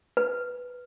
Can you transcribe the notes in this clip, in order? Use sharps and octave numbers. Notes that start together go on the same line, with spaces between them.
B4